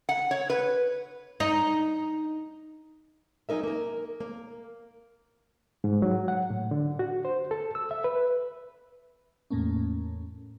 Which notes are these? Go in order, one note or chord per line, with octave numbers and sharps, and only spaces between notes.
F#5
C#5
B4
D#4
F#3 C#4 D#4 A#4 E5
A#3 A#4
A#3
G#2
F#3
F#5
A2
D3
F#4
C5
A4
E6
E5
B4
E2 A2 A3 A#3 C#4